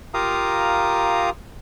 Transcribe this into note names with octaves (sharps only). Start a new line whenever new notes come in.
F4 G4 A#4 F5 A#5 D#6